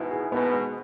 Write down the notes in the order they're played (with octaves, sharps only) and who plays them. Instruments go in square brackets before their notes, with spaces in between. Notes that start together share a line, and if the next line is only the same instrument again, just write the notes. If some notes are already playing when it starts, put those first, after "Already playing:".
Already playing: [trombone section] G#2 B2 [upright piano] E4
[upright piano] G#4
[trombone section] G#2 B2 [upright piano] B3
[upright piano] G#3